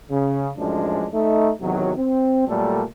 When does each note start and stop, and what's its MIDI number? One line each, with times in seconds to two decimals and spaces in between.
0.11 0.51 49
0.58 1.07 42
0.58 1.07 45
0.58 1.07 53
0.58 1.07 56
0.58 1.07 62
1.14 1.51 57
1.14 1.51 63
1.61 1.92 40
1.61 1.92 48
1.61 1.92 51
1.61 1.92 54
1.98 2.44 60
2.48 2.83 46
2.48 2.83 54
2.48 2.83 55
2.48 2.83 57
2.48 2.83 69
2.48 2.83 70